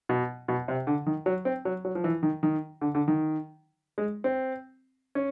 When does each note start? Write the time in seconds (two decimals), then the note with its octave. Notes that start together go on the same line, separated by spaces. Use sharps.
0.09 B2
0.48 B2
0.68 C3
0.87 D3
1.06 D#3
1.26 F#3
1.45 C4
1.65 F#3
1.85 F#3
1.95 F3
2.04 E3
2.23 D#3
2.43 D#3
2.81 D3
2.95 D3
3.08 D#3
3.98 G#3
4.24 C4
5.15 C#4